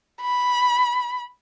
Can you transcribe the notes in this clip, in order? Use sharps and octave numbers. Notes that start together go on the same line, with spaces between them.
B5